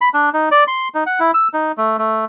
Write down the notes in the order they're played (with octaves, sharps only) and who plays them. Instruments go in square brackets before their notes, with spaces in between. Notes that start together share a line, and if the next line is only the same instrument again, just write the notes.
[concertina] B5
D4
D#4
D5
C6
D#4
F#5
E4
E6
D#4
A3
A3